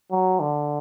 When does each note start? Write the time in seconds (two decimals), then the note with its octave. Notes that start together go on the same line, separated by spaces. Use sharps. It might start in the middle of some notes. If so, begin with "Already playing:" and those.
0.11 F#3
0.40 D3